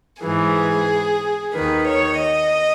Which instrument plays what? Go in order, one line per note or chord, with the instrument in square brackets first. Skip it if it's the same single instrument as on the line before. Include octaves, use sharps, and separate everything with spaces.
[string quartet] G#2 E3 G#4
D#2 D#3 B4
C#5
D#5